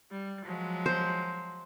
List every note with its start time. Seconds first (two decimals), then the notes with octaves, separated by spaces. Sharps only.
0.11 G3
0.45 F3 F#3 G#3
0.86 C5